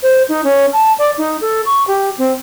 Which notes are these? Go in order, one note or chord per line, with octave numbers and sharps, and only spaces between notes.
C5
D#4
C#4
A5
D5
D#4
A4
C#6
G4
C4